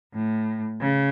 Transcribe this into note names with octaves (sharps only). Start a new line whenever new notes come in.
A2
C#3